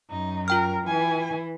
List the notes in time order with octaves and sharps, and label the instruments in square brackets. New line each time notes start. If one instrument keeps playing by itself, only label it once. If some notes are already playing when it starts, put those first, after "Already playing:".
[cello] F#2 [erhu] D#4
[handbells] F4 G5 F6 [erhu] A#4
[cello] E3 [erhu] G#5